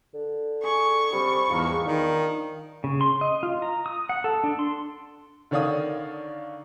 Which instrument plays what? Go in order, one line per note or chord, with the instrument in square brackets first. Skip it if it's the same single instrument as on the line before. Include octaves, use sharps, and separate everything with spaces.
[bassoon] D3
[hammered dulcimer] G#4 [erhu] C#6
[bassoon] C3 [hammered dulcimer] G3
[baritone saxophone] E2 [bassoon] G#2 [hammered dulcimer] F3 A#4
[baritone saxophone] D#3 [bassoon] D4
[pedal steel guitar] C#3
C6
D#5
F4
A#5
D#6
F#5
A4
D4
C6
[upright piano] D3 D#3 C#5 D5 F5 D#6